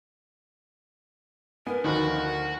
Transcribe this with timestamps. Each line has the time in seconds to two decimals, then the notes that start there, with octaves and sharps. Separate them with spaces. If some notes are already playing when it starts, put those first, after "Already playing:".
1.67 B3 A#4 G#5
1.84 D2 D#3 F3 F#4 B5 F#6